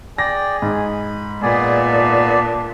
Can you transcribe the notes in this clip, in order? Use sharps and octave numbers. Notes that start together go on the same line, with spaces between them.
G#4 D5 G5 A#6
G#2 B5
A#2 B3 G#4 D5
D4